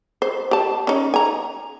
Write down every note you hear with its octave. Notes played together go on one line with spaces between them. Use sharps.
C5
G4 A5
C#4 D#4
G#5 A#5